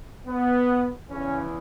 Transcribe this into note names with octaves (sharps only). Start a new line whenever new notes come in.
B3
E2 C#3 E3 C#4